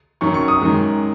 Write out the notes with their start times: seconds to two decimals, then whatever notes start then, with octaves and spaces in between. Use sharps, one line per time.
0.21 F#2 D#3 F#3 C#6
0.34 C#6
0.48 D#6
0.61 F#2 D#3 G#3